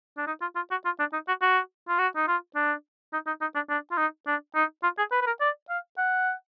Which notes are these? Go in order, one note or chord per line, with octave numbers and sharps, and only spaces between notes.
D4
D#4
F4
F4
F#4
F4
D4
D#4
F#4
F#4
F4
F#4
D#4
F4
D4
D#4
D#4
D#4
D4
D4
F4
D#4
D4
D#4
F4
G#4
B4
B4
A#4
D5
F5
F#5